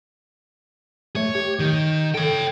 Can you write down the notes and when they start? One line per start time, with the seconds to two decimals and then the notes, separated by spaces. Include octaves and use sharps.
1.16 A3 C#5
1.35 G4
1.59 D#3 G6
2.14 A4 C#5 G5